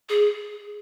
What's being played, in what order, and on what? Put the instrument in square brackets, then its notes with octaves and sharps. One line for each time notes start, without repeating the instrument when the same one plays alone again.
[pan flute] G#4